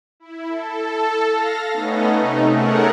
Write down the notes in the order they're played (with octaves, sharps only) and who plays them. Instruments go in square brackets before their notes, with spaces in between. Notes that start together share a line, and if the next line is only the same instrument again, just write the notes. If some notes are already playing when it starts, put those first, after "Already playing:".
[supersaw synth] E4
A4
F5 A#6
A3 B3 C#4 D#4
C3 A3 D#4
A3 C#4 G#4 A#4 F#5